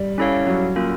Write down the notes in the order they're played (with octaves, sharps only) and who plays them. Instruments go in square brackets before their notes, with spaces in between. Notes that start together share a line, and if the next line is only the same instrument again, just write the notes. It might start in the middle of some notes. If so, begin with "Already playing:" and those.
Already playing: [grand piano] G3
[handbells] C#4 E4 A4 C#5 F5
[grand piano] F#3
[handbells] A#3 C#4 F4 A#4